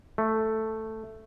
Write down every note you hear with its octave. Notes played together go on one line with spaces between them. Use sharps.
A3